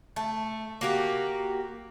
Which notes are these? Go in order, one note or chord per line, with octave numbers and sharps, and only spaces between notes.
A3
A#3 F#4 G4